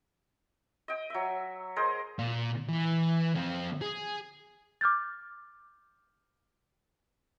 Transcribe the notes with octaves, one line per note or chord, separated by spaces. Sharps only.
D#5 G5
F#3 E5
G#4 A#4 C5 D#5
A#2
E3
F3 C4
G#4
D6 F6 G6 A6